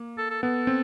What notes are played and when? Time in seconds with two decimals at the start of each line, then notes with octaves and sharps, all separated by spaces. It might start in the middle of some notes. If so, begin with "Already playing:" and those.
Already playing: A#3
0.18 A4
0.30 A4
0.43 B3 A4
0.67 C4